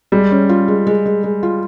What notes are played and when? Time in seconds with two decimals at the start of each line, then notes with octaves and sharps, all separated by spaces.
0.12 G3 G#3
0.31 C#4
0.49 F4
0.68 G#3
0.87 G#3
1.05 G#3
1.24 G#3
1.43 F4